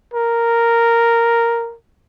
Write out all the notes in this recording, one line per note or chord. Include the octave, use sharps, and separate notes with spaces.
A#4